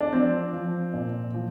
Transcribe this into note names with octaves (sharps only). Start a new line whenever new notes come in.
D4
F3 C4
F3
A#2
F3